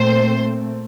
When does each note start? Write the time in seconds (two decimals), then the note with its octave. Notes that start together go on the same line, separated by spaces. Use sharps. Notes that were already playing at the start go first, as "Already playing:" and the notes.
Already playing: A#2 A3 C4 C5